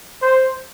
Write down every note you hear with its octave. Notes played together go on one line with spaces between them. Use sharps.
C5